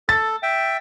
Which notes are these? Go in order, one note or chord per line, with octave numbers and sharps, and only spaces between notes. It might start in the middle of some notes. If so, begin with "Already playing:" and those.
A4 A6
E5 G5